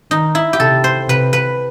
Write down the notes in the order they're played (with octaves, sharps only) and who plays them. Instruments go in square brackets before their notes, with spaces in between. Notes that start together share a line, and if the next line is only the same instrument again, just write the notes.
[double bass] D#3 [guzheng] D#4
[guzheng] E4
G4
[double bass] C3 [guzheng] A4
[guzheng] C5
[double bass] C3 [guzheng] B4
[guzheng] B4